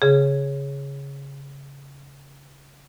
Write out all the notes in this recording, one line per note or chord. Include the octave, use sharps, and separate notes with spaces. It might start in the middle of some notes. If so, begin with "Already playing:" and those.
C#3 G#4